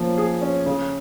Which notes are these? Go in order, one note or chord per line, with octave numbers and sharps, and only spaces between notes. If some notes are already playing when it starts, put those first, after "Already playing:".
Already playing: F3 A#3 C#4
G#4
C#4
C#3